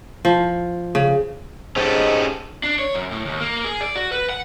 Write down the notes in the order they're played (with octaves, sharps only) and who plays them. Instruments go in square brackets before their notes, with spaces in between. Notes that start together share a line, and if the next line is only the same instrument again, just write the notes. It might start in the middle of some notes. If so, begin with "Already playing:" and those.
[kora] F3
C#3
[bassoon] G#2 [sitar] F#3 D#4 [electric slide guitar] C#4 G4 A4
[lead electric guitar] D4
C#5
F#2
A2
D#2
A#3
G#4
D5
F#4
B4
F#5